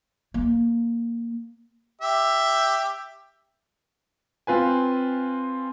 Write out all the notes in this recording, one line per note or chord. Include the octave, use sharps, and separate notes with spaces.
A#3
G4 E5
C4 F4 B4 G#5